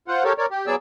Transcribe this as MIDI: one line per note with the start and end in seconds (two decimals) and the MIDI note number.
0.08 0.23 65
0.08 0.23 72
0.08 0.23 78
0.24 0.33 67
0.24 0.33 69
0.24 0.33 70
0.24 0.33 73
0.38 0.46 70
0.38 0.46 73
0.38 0.46 74
0.51 0.66 67
0.67 0.75 54
0.67 0.75 59
0.67 0.75 68
0.67 0.75 74
0.67 0.75 88